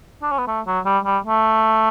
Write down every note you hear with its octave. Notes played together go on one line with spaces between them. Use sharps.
D4
C#4
B3
A3
F#3
G3
G3
A3